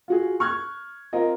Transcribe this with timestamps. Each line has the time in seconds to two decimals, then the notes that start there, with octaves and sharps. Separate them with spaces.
0.08 F4 F#4 G#4
0.40 C#6 F6 F#6 G#6
1.13 C4 F4 A#4 D#5